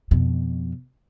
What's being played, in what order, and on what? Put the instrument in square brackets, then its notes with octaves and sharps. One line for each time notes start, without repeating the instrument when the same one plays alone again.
[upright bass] F2 B2